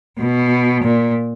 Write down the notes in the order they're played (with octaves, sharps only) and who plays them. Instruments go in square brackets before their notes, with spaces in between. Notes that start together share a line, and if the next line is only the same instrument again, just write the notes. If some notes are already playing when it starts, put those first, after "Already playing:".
[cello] B2
A#2